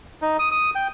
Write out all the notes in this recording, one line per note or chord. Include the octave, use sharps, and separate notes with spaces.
D#4
D#6
D#6
G5